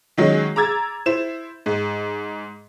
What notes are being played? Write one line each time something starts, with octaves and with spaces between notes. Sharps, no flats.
D#3 F#3 G#3 C#4 D#4
A#5 D6 E6 G#6 A6
E4 C5 E7
G#2